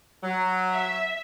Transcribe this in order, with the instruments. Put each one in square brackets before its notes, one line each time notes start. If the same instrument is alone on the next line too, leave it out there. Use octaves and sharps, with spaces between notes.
[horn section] F#3
[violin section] E5